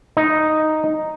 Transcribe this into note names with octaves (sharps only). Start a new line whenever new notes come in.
D#4